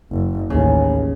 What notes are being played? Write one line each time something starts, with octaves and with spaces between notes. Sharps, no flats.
F#1
A1 D#2 C#3